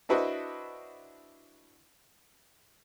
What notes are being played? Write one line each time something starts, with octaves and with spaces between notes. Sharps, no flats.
D4 E4 F#4 B4 C5 D#5